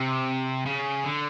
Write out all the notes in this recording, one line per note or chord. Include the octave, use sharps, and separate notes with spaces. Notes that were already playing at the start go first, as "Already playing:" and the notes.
Already playing: C3
C#3
D3